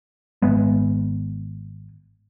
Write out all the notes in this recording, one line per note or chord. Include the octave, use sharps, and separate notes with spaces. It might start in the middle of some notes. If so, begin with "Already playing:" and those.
G#1 G#3 B3